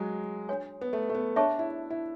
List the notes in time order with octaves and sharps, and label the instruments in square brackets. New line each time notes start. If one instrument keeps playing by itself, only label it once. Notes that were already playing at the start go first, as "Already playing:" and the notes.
Already playing: [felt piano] F#3 G#3
[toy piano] D4 F#4 C#5 G#5
[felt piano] B3
A3
A3
B3
[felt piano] D4 [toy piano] G#4 C#5 E5 A5 C#6
[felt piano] E4
E4